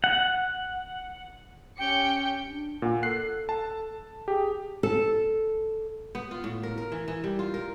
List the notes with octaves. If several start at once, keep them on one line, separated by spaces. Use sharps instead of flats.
F#5
C#4 G4 G5 C#7
D4
A#2 F#5
A4 F#6 C7
A5
G4 G#4
A4
B3
F4
A2
A#4
A#4
E3
E3
G3
F4
A#4